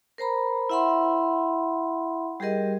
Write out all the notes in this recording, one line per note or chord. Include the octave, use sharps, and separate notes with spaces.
A#4 C5 A#5 B5
E4 E5 F#5 B5 C6
G3 G4 G#4 A#4 D#5